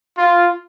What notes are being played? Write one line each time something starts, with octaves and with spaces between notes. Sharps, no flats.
F4